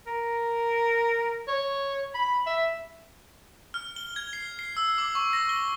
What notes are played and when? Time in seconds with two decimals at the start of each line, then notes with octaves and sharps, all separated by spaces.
0.07 A#4
1.48 C#5
2.15 B5
2.47 E5
3.74 F6
3.96 G7
4.16 G#6
4.33 C7
4.59 C7
4.77 E6
4.98 D6
5.15 C#6
5.33 A#6
5.49 G7